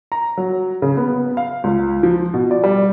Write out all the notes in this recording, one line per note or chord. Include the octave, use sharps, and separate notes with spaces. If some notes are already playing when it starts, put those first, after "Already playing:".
A#5
F#3
C#3
B3
F5
C#2
F3
B2
D5
G3